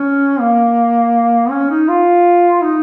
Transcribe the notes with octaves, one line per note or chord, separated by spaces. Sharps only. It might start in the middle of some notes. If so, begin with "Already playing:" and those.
Already playing: C#4
A#3
C#4
D#4
F4
D#4